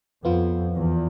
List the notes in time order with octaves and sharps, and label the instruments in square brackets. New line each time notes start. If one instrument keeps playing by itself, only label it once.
[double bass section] F2 [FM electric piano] F3 B3 F4
[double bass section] E2